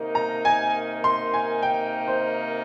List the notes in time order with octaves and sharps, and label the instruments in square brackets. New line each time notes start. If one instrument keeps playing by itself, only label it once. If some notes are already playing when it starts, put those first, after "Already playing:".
Already playing: [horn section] C3 D#3 A#3 D#4 A#4
[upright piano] A#5
G#5
C6
G#5
G5
C5